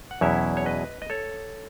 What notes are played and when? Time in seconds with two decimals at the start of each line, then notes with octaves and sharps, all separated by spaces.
0.11 F#5
0.21 E2 B2 F#3 C#4 E4 C#5 E5
0.57 C#5
0.66 B4 D#5
1.02 D#5
1.10 A4 C#5